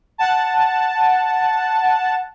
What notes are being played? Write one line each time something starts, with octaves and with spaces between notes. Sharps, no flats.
F#5 A5